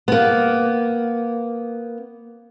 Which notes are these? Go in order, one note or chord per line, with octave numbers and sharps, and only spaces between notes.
A#3 B3